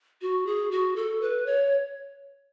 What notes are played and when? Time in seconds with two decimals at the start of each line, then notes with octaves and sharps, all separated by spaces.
0.22 F#4
0.46 G#4
0.71 F#4
0.96 A4
1.21 B4
1.46 C#5